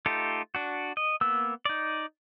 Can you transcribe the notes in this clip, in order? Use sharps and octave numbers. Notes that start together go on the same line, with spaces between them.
A3 D#4 F4 G4 A4
D4 F#4
D#5
A#3 B3 E6
D#4 D5